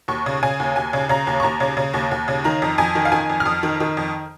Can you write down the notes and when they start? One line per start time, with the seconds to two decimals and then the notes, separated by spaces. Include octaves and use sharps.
0.08 D#2 C#6
0.26 C#3
0.43 C#3 G#5
0.60 D#2
0.76 D#2 G#5
0.93 C#3
1.09 C#3 A#5
1.27 D#2
1.40 C#6
1.43 D#2 A#5
1.60 C#3
1.77 C#3
1.94 D#2
2.11 D#2
2.28 C#3
2.44 D#3 A#5
2.62 F2
2.78 F2 G#5
2.95 D#3
3.05 F5
3.12 D#3 G#5
3.30 F2
3.40 F6
3.45 F2 D#6
3.63 D#3
3.80 D#3
3.97 F2